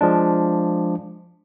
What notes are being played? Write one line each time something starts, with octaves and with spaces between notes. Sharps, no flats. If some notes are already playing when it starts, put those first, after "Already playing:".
F3 G#3 D4